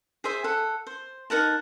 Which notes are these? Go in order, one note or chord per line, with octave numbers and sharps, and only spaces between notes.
G#4 C5 E5 G#5
A4 F#5
C5
D#4 A#4 F#5 A5